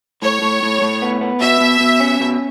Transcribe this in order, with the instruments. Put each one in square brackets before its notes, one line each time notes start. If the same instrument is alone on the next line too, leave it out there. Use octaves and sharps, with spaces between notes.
[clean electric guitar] A2 [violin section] C#5
[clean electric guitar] A2
A2
A2
B3
B3
[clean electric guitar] B2 [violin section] E5
[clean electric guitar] B2
B2
C#4
B2